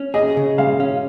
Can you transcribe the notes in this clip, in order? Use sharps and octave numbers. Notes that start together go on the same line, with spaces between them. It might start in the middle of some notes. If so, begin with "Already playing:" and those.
Already playing: C#4
G#4 D#5
C#3
G#3 F5
C#4